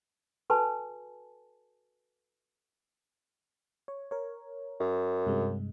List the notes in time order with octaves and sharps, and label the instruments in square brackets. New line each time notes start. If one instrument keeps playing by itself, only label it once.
[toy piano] F#4 A4 B4 G#5 A5 B5
[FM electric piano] C#5
A#4 C#5
[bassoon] F#2
[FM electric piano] G2 C3 G#3